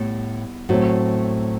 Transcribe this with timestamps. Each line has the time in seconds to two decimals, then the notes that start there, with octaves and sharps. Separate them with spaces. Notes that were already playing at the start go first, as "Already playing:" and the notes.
Already playing: A2 G3 B3
0.69 A2 F#3 A3 C4